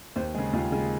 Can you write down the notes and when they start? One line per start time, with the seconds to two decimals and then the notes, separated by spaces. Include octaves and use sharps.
0.16 D#2 C5
0.34 G#3 G#4
0.38 C#3
0.53 D#2 F4
0.72 C#3 G#3